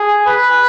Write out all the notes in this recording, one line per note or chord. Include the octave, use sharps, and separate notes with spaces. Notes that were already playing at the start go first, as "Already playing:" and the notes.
Already playing: G#4
B4